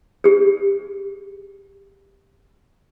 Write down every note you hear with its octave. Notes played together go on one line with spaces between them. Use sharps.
G4 G#4